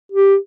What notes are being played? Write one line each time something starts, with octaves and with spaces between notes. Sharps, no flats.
G4